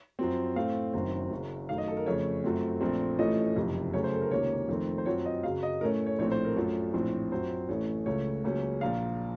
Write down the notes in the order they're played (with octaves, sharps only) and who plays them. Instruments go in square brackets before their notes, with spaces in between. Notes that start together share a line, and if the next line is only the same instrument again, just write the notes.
[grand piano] F#2 F3 C4
A2 A3 C4 F5
F#1 F#2 D#3 F#3 C4
F#1 F#2 C#3 F#3
F#2 D#3 A3 F5
D#5
A4
A#4
F2 C#3 A3 C#4 C#5
F#2 F3 A3 C4
A#1 A#2 A3 C4
A1 A2 F3 A3 C#4 D#5
F#1 F2 C3
F#2 C#3 A3 C#4 C#5
C5
A4
A#4
C#2 C3 D#3 A#3 C#4 C#5
F2 D#3 A3 C4
C5
F#2 F3 C4 C#5
D#5
F#2 C#3 F#3 F5
D#5
A2 A3 C#4 A#4
C#5
A#1 A2 A3 C4 C#5
C5
A#4
F#2 F3 A3 C#4
A#1 A2 F3 C4
F#2 F3 C4 C5
A1 A2 A3 C#4
C#2 C#3 A3 C#5
C#2 C#3 F#3 A#3 C#4
A#1 A#2 F3 F5